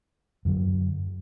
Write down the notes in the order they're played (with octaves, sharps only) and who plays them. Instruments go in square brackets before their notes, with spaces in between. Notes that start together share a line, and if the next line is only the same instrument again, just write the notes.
[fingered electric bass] F#2 D3 F#3